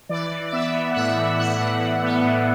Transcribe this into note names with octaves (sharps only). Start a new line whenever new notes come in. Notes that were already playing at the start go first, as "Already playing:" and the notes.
E3 D5
E3
D5
B3 E5
B3
F#5
A2 E5
E3
A2 F#5
A2
A2
B3
A2